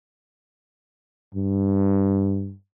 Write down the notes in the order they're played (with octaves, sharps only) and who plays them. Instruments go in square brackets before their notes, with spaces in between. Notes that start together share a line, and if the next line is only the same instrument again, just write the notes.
[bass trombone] G2